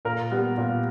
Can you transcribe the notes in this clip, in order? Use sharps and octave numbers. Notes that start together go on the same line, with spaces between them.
A#2 A#4
G3 B3
A#2